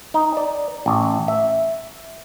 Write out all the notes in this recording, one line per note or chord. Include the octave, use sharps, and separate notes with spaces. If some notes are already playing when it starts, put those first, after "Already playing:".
D#4
D5
A1
E5